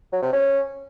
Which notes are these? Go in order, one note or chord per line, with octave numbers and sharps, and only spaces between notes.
F#3
C3
C#4